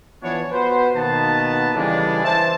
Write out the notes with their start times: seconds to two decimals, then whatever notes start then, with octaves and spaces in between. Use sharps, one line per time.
0.23 E3 F3 B3 D4 C#5
0.52 B3 F#4 B4 C5
0.95 B2 D#3 A#3 B3 A5
1.75 C#3 E3 G3 G#3 D4 A4
2.24 E3 C5 E5 A5